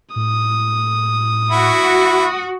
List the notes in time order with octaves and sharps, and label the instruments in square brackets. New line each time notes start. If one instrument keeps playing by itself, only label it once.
[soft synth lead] A2 [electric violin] D#6
[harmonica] E4 [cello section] F#4